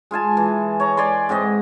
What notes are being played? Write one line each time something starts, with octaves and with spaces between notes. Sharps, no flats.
G#3 F4 G#5 A5
E3
C#5 A#5
D5 G#5 B5 C6
G#2 C4 B4 D#5